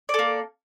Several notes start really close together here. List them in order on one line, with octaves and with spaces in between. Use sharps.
D5 A4 A#3